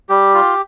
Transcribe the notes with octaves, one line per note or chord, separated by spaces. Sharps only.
G3 G4
F4